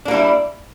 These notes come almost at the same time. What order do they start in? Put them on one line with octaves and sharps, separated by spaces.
D4 A#3 G3 E4